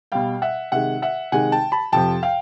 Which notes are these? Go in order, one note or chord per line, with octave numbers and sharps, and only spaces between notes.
B2 G3 F5 G5
E5 F#5
C3 D#3 G#3 E5 F#5
E5 F#5
C3 D#3 G#3 F#5 G#5
G5 A5
A5 B5
F2 C3 F3 G5 A5
F5 G5